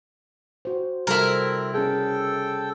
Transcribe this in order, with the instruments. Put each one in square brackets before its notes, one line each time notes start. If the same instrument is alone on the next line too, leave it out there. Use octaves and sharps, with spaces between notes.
[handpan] F#4 C5
[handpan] C3 G3 A4 [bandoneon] C4 [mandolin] E4 A#4
[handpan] C#4 G#4 [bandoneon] A4 G5